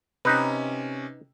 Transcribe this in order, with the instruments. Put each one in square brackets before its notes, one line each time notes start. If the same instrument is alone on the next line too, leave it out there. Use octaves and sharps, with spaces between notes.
[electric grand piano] C3 C#4 [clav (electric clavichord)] D#4 B4